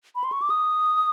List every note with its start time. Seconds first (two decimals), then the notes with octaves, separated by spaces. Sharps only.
0.15 B5
0.24 C6
0.32 C#6
0.42 D6
0.50 D#6